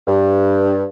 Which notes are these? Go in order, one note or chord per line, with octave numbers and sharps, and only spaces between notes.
G2